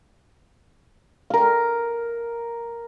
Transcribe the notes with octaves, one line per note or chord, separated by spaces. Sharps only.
A#4 F5